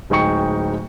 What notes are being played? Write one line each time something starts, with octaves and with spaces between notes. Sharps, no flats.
D1 G#3 D#4 G5 C#6 C#7